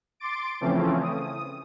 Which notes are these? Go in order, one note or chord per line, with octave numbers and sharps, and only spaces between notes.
C6 D6 A6 D7
C#3 E3 F3 A3 C4 C#4
D#6